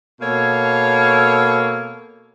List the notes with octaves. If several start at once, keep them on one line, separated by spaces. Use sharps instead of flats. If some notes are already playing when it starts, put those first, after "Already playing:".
B2 A#3 A4 C#5